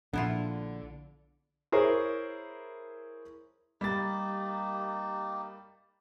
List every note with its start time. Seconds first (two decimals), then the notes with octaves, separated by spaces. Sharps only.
0.13 A#1 D3 B3 D4 E4 F4
1.72 E4 G#4 A#4 C5 C#5
3.81 G3 A#3 D#4 G4 A6